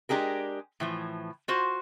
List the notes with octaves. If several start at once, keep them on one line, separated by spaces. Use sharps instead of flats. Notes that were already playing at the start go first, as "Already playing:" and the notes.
G#3 D4 G4 G#4 A#4
A2 E3 F3
F4 F#4 C5